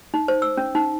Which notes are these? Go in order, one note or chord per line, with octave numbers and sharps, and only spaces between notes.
D#4
C5
E6
C#4
D#4